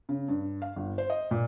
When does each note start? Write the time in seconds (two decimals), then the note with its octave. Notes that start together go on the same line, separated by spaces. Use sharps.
0.09 C#3
0.28 G2
0.62 F5
0.76 G1
0.98 C5
1.10 D#5
1.31 A#2